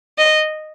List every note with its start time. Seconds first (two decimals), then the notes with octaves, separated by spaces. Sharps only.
0.18 D#5